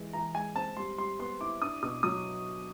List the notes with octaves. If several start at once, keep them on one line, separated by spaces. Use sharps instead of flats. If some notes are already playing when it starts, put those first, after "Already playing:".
Already playing: E3 G#3
E3 A#5
G#3 G#5
C4 A5
G3 C6
G3 C6
B3 C6
E4 D6
D4 D#6
B2 D#6
F#3 D#6